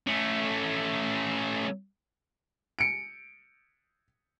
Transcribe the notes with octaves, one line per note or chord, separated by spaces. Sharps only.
A3 C#4
C#7 D7